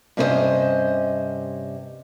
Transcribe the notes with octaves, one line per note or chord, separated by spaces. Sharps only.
G2 C3 C#4 A#4 C5 D#5